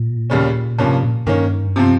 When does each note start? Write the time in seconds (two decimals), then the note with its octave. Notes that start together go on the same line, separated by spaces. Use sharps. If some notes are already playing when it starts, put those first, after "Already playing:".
Already playing: A#2
0.30 D#2 C#3 G3 C#4
0.79 G2 C3 F3 A#3 C#4
1.03 A#2
1.26 G2 D#3 A#3 C#4
1.76 C3 F3 C4